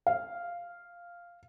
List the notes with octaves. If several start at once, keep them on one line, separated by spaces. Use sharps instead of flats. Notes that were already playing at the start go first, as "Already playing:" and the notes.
F5